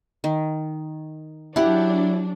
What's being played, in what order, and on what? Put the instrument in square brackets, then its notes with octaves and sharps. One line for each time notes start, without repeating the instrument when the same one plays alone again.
[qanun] D#3
[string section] F#3 D4 [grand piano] E4 [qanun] G4 F#5